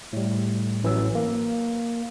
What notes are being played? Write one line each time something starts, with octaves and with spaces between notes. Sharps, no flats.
A2 G3
A1 E3 F#3 E6
A#3